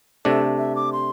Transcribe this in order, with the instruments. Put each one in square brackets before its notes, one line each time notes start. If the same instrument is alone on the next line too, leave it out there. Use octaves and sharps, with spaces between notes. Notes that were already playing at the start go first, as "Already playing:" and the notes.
[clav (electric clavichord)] C3 A3 D4 [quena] A4
[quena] E5
D6
C6